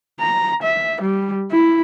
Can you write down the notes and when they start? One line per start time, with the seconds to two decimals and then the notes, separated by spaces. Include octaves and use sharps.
0.20 A#5
0.62 E5
1.01 G3
1.52 E4